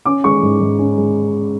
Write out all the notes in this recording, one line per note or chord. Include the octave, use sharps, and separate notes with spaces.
C#4 D6
G#3 C#6
G#2
G#2
C#4
G#3